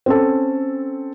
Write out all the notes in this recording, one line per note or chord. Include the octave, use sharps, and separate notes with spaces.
C4 C#4 A4